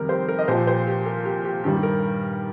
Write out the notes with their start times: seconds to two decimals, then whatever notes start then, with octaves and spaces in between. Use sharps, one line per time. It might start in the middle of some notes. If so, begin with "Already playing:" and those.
Already playing: F2 C3 D#3 G3 A#4
0.09 G4 C5
0.28 A#4
0.39 D#5
0.48 A#2 F3 G4 C5
0.67 G4 C5
0.87 G4
1.06 A#4
1.25 G4
1.45 G4
1.64 G2 D#3 G3 G4
1.77 G4
1.83 A#4